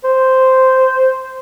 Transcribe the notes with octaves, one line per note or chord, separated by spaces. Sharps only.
C5